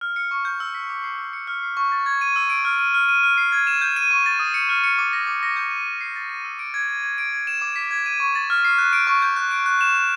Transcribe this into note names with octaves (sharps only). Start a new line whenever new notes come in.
F6
C#7
C#6
G6
E6
B6
D6
C7
E6
C#7
F6
C7
C#6
A6
G#6
D#7
E6
D7
F6
D#7
F6
D#7
F6
C7
G#6
E7
G6
D#7
C#6
A6
D#6
C#7
F6
C#7
D6
A#6
D6
A#6
G6
D#7
F6
C7
A6
D#7
E6
D7
G#6
D#7
G#6
D7
G#6
E7
D6
B6
G#6
D#7
C#6
A6
F6
C7
F#6
D7
C#6
G6
F#6
D7
F#6
E7
F#6